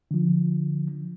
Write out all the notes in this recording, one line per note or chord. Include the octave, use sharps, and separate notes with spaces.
D3 F3